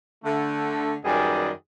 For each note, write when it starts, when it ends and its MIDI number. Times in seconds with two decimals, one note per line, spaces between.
0.24 0.95 50
0.24 0.95 57
1.04 1.49 42
1.04 1.49 51
1.04 1.49 55
1.04 1.49 68
1.04 1.49 71
1.04 1.49 74